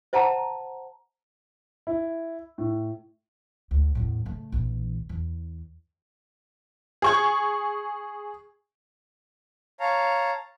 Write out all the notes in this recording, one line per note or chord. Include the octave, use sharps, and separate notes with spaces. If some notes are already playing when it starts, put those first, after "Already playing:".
C5 E5 F#5 A5 A#5
E4
A2
D2
E2 A2
C#3 A3
A#1 E3
E2
G#4 C#6 G#6
C#5 F5 A5 A#5